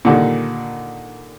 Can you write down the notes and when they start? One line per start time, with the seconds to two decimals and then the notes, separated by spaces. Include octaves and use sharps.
0.05 A#2 D3 D#3 G3